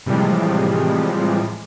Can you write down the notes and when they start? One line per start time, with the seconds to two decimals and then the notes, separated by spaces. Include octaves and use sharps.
0.06 A2 C3 E3 F3 G3 G#3